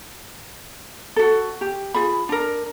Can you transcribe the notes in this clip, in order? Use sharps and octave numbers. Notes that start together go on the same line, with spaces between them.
F#4 A4
G4
F4 G#4 B5
D4 A#4